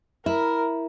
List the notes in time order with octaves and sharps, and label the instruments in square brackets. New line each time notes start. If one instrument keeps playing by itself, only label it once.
[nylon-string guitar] E4 [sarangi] A#4